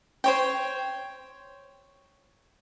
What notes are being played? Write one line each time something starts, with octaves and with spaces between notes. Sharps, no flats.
C5 C#5 G5